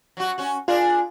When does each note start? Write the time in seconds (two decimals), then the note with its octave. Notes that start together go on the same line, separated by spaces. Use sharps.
0.17 F#3 F#4
0.38 C#4 F#4
0.68 D4 F4 G#4 A#4